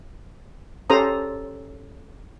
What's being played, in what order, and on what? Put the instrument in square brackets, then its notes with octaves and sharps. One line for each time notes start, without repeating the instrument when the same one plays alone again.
[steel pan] C#4 G4 A4 C5 A#5 D#6